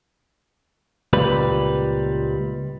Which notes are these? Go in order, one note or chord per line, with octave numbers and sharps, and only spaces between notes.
C#2 A#2 G3 B4